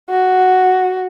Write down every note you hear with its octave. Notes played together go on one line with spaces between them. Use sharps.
F#4